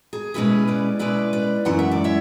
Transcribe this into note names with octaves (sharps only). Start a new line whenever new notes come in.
G#4
B2 G#3 C#4 E4 G#4 B4
B4 D5
B2 G#3 C#4 E4 B4 D5
B4 D5
F#2 E3 G#3 C#4 E4 F#5
E5
D5
C#5 E5